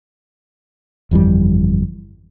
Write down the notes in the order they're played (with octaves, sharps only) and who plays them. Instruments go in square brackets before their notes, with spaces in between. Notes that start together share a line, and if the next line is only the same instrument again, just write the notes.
[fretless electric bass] G1 F2 E3 G3